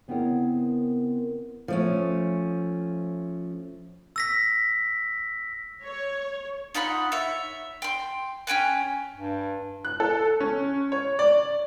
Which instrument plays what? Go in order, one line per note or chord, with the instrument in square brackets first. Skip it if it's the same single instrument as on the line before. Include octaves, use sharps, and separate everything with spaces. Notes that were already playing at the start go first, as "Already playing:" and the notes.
[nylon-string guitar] C#3 B3 C4 E4 A#4 C#5
[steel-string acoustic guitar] F3 A3 C#4
[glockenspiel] E6 A#6 B6
[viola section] C#5
[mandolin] D#4 F4 F#5 B5
C#5 E5
G5 C6
C#4 G5 G#5 F#6
[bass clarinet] G2
[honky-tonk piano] F#6
A4
C#4
C#5
D5